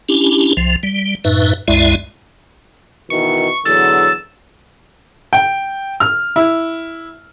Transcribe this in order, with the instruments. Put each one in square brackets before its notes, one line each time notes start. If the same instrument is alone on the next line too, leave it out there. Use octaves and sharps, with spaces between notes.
[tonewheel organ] C#4 D4 E4 G4
C2 F3
G3
F#2 A2 D#4 B4 E5
C2 F#2 G#3 E4 D5 E5
[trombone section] B2 D#3 E3 [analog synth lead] C#6
[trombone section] E2 D3 F#3 [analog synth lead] E6 [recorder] A6
[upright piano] G5
F6
E4